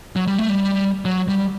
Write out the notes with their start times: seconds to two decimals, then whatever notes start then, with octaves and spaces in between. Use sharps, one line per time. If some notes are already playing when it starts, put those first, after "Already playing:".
0.16 F#3
0.27 G3
0.39 A3
0.50 G3
1.05 F#3
1.28 G3